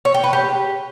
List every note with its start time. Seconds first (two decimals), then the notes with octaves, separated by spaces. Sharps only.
0.05 C#5
0.14 G5
0.24 B4
0.33 G4